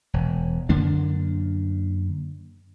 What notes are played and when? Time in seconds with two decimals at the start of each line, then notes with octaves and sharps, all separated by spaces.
0.14 E1
0.69 F#2 D3 A#3 D4